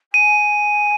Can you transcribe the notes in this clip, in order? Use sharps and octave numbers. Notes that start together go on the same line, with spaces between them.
G#5 D#7